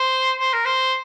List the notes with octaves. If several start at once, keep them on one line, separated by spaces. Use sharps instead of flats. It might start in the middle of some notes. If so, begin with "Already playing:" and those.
Already playing: C5
C5
A#4
C5